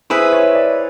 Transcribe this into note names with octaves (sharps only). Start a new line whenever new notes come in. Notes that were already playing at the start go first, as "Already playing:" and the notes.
E4 G#4 B4 C5 E5
C#5
D5